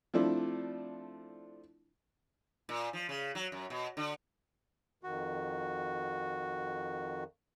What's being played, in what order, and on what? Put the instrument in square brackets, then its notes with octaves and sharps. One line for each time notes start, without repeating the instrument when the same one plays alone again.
[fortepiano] F3 A3 C4 D4 E4
[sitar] A#2
F3
C#3
F#3
F#2
B2
D3
[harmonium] F2 D#3 [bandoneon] F#4